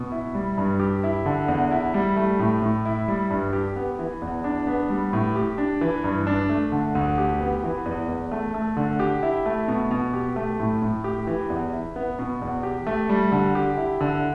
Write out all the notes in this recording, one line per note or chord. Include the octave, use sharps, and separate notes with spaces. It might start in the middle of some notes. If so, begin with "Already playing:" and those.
Already playing: B2
E4
G3
G2
G4
E4
D3
E2
E4
G3
A3
A2
A2
E4
G3
G2
G4
B3
E3
E2
D4
B3
G3
A2
G4
D4
E3
G2
D4
A3
D3
D2
G4
B3
E3
E2
E2
A3
A3
D3
G4
E4
A3
B2
B2
G4
A3
A2
A2
G4
E3
E2
E4
B3
B2
E2
G4
A3
G3
D3
G4
E4
D3